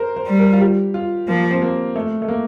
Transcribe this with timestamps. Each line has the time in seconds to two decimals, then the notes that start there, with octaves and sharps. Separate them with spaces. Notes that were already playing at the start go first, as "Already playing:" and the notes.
Already playing: A#4 C5
0.16 C5
0.27 G3
0.39 A#4
0.53 F4
0.61 G4
0.94 F4
1.28 F3 A#3
1.51 C4
1.62 A#3
1.96 A3
2.22 A3
2.28 A#3